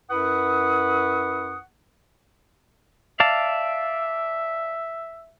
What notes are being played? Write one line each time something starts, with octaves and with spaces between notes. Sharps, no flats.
F#2 E4 B4 F#5 C#6 D#6
D5 E5 F5 A5